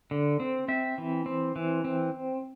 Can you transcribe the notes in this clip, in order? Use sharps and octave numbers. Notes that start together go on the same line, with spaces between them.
D3
C4
C4 E5
E3
C4
E3
C4